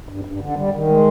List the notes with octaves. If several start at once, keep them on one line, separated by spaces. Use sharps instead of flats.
G2
G2
D3
G3
D#3
G#3